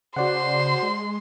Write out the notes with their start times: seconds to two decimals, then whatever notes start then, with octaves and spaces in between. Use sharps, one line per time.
0.16 C#3 F#4 C5 D5 F#5 C6
0.83 G#3